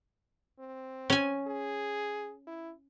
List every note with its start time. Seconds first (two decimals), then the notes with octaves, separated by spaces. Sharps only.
0.59 C4
1.10 C#4 G#5
1.47 G#4
2.47 E4